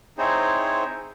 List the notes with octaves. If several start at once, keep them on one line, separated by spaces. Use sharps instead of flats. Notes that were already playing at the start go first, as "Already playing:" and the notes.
C4 D#4 E4 G#4 C5 C#5